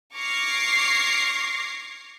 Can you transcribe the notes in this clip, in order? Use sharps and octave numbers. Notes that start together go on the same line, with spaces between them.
C#6 D6 F6 G#6 A#6 C7